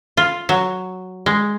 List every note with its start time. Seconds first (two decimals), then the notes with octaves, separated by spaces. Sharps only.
0.17 F4
0.49 F#3
1.26 G#3